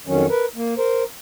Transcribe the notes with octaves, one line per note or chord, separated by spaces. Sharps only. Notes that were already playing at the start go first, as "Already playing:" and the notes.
F2 D#3 F#3 C#4
A#4 B4
A#3
A#4 C5